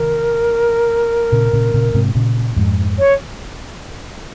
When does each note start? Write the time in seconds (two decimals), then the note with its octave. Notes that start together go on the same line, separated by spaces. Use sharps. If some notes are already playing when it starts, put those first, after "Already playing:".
Already playing: C3 D#3 A#4
1.32 A#2 C#3
1.53 A#2 C#3
1.74 A#2 C#3
1.94 G#2 C3
2.15 A#2 C#3
2.56 F2 G#2
2.99 C#5